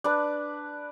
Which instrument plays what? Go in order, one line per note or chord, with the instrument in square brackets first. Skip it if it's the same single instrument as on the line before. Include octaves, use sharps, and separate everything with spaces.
[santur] D4 B4